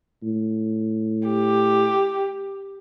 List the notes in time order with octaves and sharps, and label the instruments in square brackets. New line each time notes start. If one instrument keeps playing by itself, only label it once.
[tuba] A2
[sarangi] G4